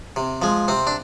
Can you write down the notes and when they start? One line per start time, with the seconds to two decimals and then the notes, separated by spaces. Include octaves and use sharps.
0.16 C3
0.42 F3 G#3
0.68 C3 C4
0.87 D4